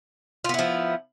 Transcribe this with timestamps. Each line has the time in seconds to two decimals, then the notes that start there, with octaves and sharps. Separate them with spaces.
0.44 F4
0.49 B3
0.54 E4
0.59 F3